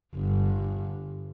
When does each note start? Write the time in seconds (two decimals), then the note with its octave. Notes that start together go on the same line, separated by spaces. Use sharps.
0.15 G1 G2